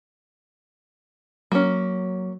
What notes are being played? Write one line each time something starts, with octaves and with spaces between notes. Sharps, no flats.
F#3 A#3 C#4